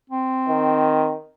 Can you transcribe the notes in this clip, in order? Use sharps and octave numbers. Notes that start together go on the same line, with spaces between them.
C4
D#3